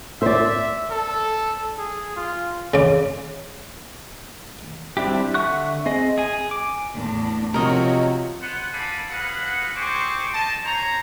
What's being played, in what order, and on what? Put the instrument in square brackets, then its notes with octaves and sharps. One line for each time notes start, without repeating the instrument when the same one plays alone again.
[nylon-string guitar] C5 D5 [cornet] E5
[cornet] A4
G#4
F4
[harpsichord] C#3 D5
[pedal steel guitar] G3 C4 D4 E4 G4
D3 E5 F#5 C#6 F#6
C4 G#4 D#5
G#4 G#5
D6
[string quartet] E2 A2 D4
[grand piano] C3 F3 [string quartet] F#4 C#5 [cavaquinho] A#4 D#5
[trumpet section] B3 C5 F#5
A4 D5 F5 G#5 B5
F#4 G#4 B4 F5 F#5
C4 G#4 C5 C#6 D6
D#5 G5 A5
C5 C#5 A#5